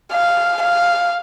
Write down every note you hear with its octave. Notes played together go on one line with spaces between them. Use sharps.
F5
F5